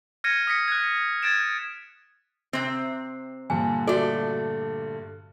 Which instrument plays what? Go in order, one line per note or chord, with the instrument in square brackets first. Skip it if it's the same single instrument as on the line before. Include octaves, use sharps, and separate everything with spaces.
[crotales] F6 G#6 A#6 C#7 D#7
D#6 A#6 B6 C#7
F#6 G#6
G#6 A6 D7 E7
[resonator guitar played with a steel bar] C3 C4
[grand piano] G2 A#2 D3 [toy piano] G#5
[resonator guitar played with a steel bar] A3 D5 [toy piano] F#4 A4